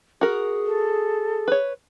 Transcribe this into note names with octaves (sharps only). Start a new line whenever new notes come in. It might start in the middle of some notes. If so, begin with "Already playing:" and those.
F#4 G#4 A#4
A4
B4 C#5